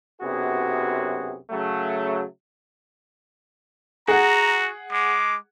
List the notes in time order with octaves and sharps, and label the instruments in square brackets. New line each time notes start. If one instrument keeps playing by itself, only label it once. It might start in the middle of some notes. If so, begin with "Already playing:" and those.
[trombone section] B1 F#2 C3 B3 F#4 G#4
C#3 F#3 A3
[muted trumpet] F#4 [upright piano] G#4 F#5 [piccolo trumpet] A#5
[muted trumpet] G#3 [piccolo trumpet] D6